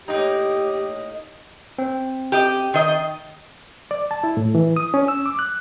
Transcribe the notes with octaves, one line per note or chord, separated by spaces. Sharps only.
A2 A#3 D#4 G4
C4
G4 D#5
D#3 D#5
D5
A5
E4
A2
E3
D#6
C#4
E6
D6
F#6